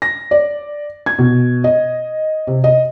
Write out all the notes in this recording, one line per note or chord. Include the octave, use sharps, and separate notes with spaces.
A#6
D5
G#6
B2
D#5
C3
D#5